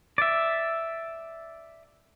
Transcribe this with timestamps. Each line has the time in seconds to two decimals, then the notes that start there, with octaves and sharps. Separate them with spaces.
0.18 D5 E5